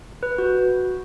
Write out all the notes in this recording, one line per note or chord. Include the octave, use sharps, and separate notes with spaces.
B4
F#4